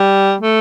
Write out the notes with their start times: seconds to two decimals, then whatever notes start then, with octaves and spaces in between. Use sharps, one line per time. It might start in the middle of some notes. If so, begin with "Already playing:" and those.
Already playing: G3
0.41 A3